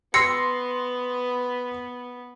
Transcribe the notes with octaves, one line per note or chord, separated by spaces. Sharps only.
B3 C6 E6 A#6 C7 C#7